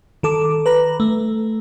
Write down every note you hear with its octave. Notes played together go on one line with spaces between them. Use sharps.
D#3 A4 D6
B4 A#5
A3